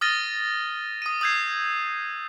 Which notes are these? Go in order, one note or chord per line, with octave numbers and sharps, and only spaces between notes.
D#6 F6 A6 A#6 D#7 G7
D#6 D#7
D#6 E6 G6 G#6 C7